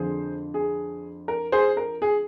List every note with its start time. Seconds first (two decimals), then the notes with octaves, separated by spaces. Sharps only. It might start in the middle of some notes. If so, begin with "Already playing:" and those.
Already playing: F2 D3 F3 G#4 C5
0.54 G#4
1.28 A#4
1.52 G#4 C5
1.77 A#4
2.02 G#4